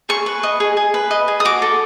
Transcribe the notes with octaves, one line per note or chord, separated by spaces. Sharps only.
G#4 C#6
B4
D#5
G#4
G#4
B4
D#5
G#4
D#6
F#4 D6
A4